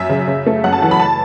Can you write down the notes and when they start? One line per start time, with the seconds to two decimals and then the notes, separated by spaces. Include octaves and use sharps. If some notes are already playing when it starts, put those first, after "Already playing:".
Already playing: F#2 E5
0.09 C#3
0.27 C#3
0.46 A3
0.64 F#2 F#5
0.73 A5
0.82 E3 F#5
0.91 B5
1.00 A5